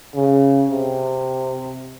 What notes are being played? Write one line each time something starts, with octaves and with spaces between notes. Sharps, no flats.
C#3
C3